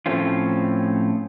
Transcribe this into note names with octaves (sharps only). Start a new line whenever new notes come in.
A2 F3 A3 C4 C#4 F4